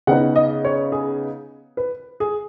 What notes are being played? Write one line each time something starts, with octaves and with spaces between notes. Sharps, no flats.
C#3 B3 D#4 F#5
D#5
C#5
G#4
B4
G#4